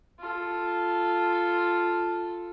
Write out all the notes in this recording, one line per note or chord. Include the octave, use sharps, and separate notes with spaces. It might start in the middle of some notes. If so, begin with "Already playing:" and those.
F4 A4